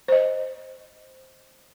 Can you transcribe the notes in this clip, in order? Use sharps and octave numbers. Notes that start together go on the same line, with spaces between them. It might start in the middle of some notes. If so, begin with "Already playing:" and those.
C5 D#5